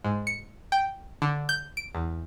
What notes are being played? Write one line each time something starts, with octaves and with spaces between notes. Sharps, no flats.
G#2
C#7
G5
D3
G6
D7
E2